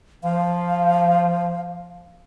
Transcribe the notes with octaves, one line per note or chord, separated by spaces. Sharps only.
F3 F5